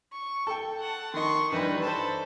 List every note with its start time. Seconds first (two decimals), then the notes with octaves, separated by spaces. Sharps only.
0.12 C#6
0.47 A4 G5
0.80 F#5 A5
1.14 D#3 D#5 C6 C#6
1.52 G2 E3 G3 D#4 B4
1.82 A4 C5 B5